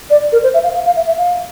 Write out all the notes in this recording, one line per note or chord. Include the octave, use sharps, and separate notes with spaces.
D5
A#4
C5
E5
F5
F5
F5
E5
E5
F5